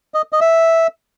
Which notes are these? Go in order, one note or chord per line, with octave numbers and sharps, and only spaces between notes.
D#5
D#5
E5